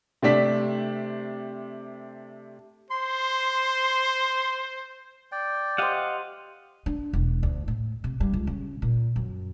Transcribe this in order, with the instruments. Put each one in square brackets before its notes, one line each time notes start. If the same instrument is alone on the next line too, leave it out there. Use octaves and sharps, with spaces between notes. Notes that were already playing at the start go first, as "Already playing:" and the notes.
[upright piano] C3 A3 D4 B6
[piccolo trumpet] C5 [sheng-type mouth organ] C6
[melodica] D5 G5
[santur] G4 C5 [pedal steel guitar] D#5 F5 F#5
[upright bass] D4
E1
D2
A2
C3
G2
C#2
C#3
A#2
F#2